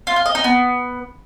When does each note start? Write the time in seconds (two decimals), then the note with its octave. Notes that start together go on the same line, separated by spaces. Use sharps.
0.07 F4
0.16 F5
0.26 D#5
0.35 D#4
0.44 B3